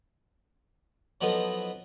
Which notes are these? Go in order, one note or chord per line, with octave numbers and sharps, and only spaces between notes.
F3 F#3 B3 D#4 A4 B4